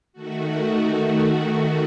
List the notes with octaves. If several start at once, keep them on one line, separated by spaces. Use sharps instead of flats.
D#3 A3 F#4